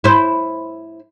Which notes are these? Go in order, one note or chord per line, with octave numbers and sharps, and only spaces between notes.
E4 C5